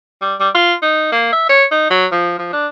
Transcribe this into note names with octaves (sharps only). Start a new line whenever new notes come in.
G3
G3
F4
D#4
A#3
E5
C#5
D#4
F#3
F3
F3
D4